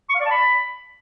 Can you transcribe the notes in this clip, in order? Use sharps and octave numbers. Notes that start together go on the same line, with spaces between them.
C#6
F5
D5
A5
B5